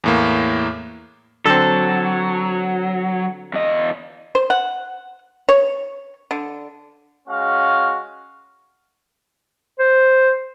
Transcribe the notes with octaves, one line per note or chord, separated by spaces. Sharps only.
E2 A2 A#3
D3 F#3 C4 A4
E2 D#5
C5
F#5
C#5
D3
G#3 C#4 F#4 F5
C5